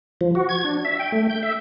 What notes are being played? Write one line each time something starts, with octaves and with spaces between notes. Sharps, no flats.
F3
F#4
G#6
D4
E5
G5
A3
G6
E5